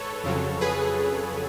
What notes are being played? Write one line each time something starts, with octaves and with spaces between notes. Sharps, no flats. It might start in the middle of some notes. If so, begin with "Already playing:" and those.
Already playing: G#2 A4 B4 C#5
F2 C#3 F#3
G#4 B4